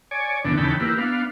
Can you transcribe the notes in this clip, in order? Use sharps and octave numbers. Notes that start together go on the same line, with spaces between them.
C#5 D5 G#5
D2 D3 E3 B3 D4
D#2 C#3 E3 G5 A5 B5
A#3 E4 G4 B4
B3 D4 F5